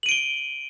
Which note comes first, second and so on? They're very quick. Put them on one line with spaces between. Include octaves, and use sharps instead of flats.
F#7 D#7 D7 G7